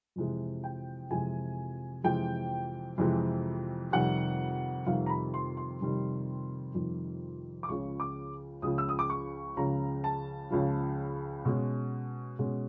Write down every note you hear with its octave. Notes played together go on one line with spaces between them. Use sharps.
F2 C3 E3 G#3
G5
F2 C3 E3 G#3 G#5
F2 C3 E3 G#3 G5
F2 C3 E3 G#3
F2 C3 D#3 G3 F#5
F2 C3 D#3 G3 F5
A#5
B5
C6
C6
F2 C3 D#3 G3
F2 C3 D#3 G3
D6
C#2 C#3 F3 C#6
D6
C#2 C#3 F3 D#6
E6
D#6
D6
C#6
C#2 C#3 F3 A#5
A5
C#2 C#3 F3
B2 G#3 C#4
B2 G#3 C#4